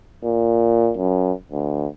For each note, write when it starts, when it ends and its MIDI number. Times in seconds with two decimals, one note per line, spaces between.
0.24 0.92 46
0.97 1.32 42
1.52 1.87 38